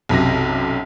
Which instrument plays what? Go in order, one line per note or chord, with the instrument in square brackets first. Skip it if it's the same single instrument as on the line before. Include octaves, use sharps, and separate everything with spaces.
[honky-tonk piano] B1 F#2 C3 A#6